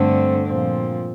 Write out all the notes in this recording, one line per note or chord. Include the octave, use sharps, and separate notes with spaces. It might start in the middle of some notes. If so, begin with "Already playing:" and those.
Already playing: G2 D3 A3 C4
A#2 F3 C4